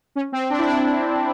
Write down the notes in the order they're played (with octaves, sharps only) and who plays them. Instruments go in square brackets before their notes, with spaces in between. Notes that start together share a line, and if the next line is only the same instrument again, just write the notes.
[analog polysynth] C#4
C4
D4
E4
D4